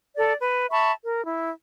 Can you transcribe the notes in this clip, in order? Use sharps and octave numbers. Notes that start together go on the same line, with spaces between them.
A4 D5
B4
E5 A5 B5 C#6
A#4
E4